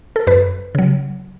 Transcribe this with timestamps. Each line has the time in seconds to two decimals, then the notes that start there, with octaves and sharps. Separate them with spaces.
0.16 A4
0.27 F#2 B4
0.75 C#3 F#3